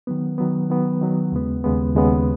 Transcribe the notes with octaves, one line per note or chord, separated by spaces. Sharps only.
D#3 F#3 B3
D#3 F#3 B3
D#3 F#3 B3
D#3 F#3 B3
D#2 C#3 G#3 B3
D#2 C#3 G#3 B3
D#2 C#3 G#3 B3